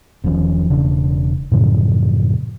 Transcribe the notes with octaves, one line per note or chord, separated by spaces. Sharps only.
E1 D#3 F3 C#4
E1 C#3 D4
F#2 A2 C#3 F3